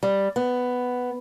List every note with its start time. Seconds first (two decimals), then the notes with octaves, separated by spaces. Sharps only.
0.03 G3
0.36 B3